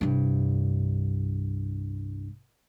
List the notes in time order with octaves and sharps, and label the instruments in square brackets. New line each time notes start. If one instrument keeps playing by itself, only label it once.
[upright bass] C2 G2